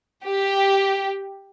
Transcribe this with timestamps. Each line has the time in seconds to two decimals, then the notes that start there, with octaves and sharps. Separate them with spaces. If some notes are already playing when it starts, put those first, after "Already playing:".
0.22 G4